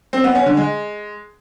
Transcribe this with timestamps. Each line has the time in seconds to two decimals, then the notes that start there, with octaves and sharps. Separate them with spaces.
0.13 C4
0.24 B3
0.35 C#4
0.46 D3
0.57 G#3